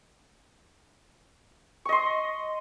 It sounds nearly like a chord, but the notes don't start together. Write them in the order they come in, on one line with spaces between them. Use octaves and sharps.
C#6 D#5 C6